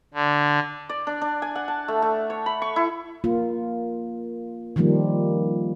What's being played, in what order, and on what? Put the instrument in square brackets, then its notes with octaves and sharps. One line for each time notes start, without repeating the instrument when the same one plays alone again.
[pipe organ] D3
[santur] D5
D4
D4
G#5
F#5
A5
A3
A3
C#5
B5
C#6
E4
[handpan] A#3 F4
D#3 F3 G3 A#3